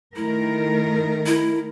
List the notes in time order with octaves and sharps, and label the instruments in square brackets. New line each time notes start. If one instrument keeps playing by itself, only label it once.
[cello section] D#3 A3 A#4 [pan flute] E4
[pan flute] E4